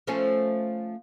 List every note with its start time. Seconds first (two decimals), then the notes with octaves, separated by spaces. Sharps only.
0.07 F3 A3 C#4